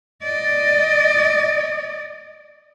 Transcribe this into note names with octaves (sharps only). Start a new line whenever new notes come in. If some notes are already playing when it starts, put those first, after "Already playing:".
D5 D#5